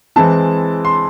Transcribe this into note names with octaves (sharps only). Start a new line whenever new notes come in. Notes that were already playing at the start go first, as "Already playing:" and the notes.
E3 G#3 C4 E4 A5
C6